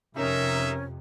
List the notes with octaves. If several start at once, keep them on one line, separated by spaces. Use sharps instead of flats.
F2 C3 C#4 D#4 A#4 E5